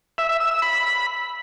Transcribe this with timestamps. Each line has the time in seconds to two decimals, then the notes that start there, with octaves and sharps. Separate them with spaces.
0.18 E5
0.29 E5
0.40 E6
0.51 E6
0.62 B5